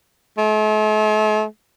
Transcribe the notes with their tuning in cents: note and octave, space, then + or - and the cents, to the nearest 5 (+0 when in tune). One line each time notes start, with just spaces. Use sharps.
A3 -45